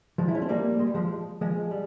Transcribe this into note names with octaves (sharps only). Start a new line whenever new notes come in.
F3 G#3
E4
C#4
C4
G3 A#3
G#3
G3
F3 G#3
F3 G#3
G3